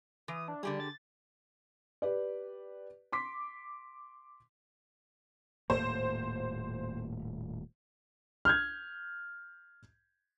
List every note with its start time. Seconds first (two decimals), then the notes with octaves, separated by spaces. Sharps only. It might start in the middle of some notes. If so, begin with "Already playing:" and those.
0.28 E3 D#6
0.48 D4
0.63 D3 G3 G4 G#4
0.80 A6
2.02 G4 B4 D5
3.12 C6 D6 B6
5.70 D#1 A2 A#3 C5
8.45 F6 G6 G#6